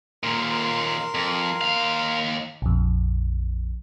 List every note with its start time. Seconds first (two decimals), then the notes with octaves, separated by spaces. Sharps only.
0.23 D#2 A#2 A#4 C6
1.15 F2
1.61 D#2 F5
2.62 A#1 F2